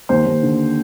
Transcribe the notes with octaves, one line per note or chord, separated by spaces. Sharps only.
D#2 C5
D#2
D3